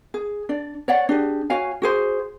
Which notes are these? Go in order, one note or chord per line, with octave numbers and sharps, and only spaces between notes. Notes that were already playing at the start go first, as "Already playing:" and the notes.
G#4
D4 D5
C#5 D5 F#5
D4 G4 G#4
F#4 C#5 F5 G#5
F#4 G#4 C5